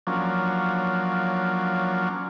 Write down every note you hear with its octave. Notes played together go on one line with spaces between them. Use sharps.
F3 F#3 A#3 C#4 D4